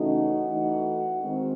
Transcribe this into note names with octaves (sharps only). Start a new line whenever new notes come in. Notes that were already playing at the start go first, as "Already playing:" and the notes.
Already playing: C#3 E3 A3 C#4 D#4 F#4
E3 A3 D#4
D#3 G#3 C4